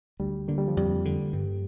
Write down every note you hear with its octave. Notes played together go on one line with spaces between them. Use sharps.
D2 G3
D3 A#3
G3
F3
F2 G3
D3
G2